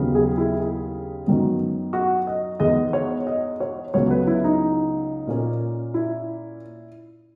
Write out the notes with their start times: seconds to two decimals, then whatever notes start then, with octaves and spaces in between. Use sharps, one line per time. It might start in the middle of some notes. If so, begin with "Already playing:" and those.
Already playing: D#2 C#3 F#3 B3
0.15 G#4
0.38 E4
0.60 G#4
1.26 F#2 D#3 F#3 B3
1.93 F#4
2.27 D#5
2.60 E2 D#3 G#3 B3 D#5
2.93 C#5
3.27 D#5
3.60 C#5
3.94 C#2 C#3 F#3 B3 C#5
4.11 B4
4.27 E4
4.44 D#4
5.27 A#2 A#3 C#4
5.94 E4